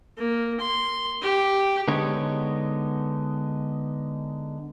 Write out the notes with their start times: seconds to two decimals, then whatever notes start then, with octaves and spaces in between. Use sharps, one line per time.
0.17 A#3
0.60 C6
1.21 G4
1.88 D3 G#3 B3 D#4 C#5